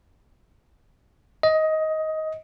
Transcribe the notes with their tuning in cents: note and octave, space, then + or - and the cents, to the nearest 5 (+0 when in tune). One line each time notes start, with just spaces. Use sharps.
D#5 +15